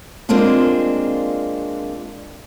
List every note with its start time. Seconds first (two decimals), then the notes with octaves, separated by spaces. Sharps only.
0.29 G#3 A#3 C4 D4 F4